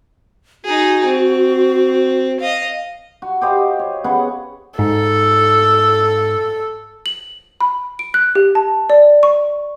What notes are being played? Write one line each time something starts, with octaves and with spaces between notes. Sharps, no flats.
D#4 F#4 G#4
C4
D#5 F5
F#4
G4 C5 D#5 F5
C#5
B3 C#4 G#4 F#5
G#2 A4
F#7
B5
D7
F#6
G4
A5
D5
C#6